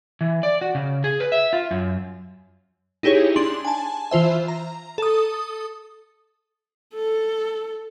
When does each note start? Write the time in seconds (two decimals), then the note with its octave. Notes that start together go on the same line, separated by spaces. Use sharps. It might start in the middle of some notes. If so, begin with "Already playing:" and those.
0.21 E3
0.43 D5
0.61 F#4
0.75 C#3
1.04 G#4
1.20 B4
1.32 E5
1.53 F4
1.71 F#2
3.03 D#4 E4 G4 G#4 C#5
3.36 D4 C6 F#7
3.65 G#5 A5
4.11 E3 F4 C5 E5
4.48 A#5
4.98 A4 D#6
6.95 A4